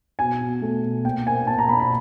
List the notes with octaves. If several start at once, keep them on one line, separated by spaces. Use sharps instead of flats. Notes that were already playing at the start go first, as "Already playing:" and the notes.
B2 G#5
B2
A3
B2
A#2 G5
A#3 G#5
A#2 A5
A#5
A#2 B5
B5